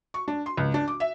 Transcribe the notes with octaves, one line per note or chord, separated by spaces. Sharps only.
C#6
D4
C6
C#2
D4
D6
E5